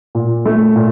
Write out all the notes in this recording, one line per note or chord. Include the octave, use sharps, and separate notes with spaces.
A#2
A3
A#2